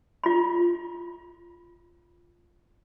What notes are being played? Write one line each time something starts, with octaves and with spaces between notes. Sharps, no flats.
F4 B5